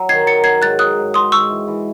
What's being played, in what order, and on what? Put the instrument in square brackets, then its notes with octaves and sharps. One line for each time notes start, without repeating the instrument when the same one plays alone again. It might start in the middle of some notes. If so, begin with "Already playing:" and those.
Already playing: [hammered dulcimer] F#3
[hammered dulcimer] D#3 [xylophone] G#6 C7
[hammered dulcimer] F#3 [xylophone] A6 C#7
[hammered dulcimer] F#3 [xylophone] G#6 C7
[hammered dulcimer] G#2 [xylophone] F#6 A6
[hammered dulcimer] F#3 [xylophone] D#6 F#6
[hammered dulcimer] G#2
[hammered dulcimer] G#2 [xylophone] C6 D#6
[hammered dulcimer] G#2 [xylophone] C#6 E6
[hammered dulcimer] E3
E3